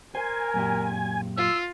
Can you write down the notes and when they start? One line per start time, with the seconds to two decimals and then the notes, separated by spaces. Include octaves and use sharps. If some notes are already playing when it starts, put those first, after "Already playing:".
0.15 A#4 C5 G#5
0.54 F#2 A#2 G4
1.37 F4 E6